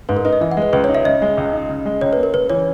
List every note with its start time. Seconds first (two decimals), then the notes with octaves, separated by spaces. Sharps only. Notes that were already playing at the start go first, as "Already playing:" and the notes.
0.09 G#2 B4
0.17 A#4
0.25 D#4 B4
0.33 D#5
0.41 E3 E5
0.51 F#5
0.57 G#3
0.62 B4
0.73 C#2 B4
0.84 C#5
0.89 D#4
0.95 E5
1.05 C#3 D#5
1.22 G#3
1.37 C#2
1.53 D#4
1.70 C#3
1.86 G#3
2.01 C#2 C#5
2.13 A#3 B4
2.23 A#4
2.34 C#3 B4
2.50 E3 C#5